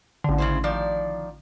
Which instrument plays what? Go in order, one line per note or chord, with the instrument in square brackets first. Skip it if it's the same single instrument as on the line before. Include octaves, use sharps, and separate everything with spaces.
[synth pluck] A1 D3
[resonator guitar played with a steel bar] C#3 E4 C5
D#3 F3 D5